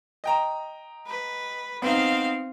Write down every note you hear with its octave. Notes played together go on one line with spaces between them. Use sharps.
D#5 G5 A#5
B4
B3 C4 D#4 F5